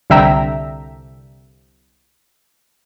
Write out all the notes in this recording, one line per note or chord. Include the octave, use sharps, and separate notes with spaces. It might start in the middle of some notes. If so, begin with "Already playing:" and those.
C2 D3 E5 G5 A#5